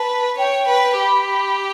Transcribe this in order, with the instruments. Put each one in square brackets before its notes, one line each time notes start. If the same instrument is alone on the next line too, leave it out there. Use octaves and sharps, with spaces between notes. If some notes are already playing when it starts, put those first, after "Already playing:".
Already playing: [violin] B4 [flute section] A5
[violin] C#5 [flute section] G5
[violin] B4
[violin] G4 [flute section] B5